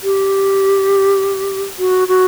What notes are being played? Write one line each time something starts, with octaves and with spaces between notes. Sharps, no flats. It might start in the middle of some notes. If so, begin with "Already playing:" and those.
G4
F#4
F#4